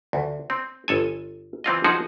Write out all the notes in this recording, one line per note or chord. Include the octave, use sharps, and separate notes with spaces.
D2
C4
G1 A4 G#5
E3 C4 F4 D#5
F3 D#4 F#4 G#4